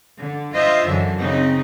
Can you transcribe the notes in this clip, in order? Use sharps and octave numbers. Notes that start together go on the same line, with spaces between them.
D3
F4 C5 D#5 E5
F#2 D3 E3
C#3 C4 D#4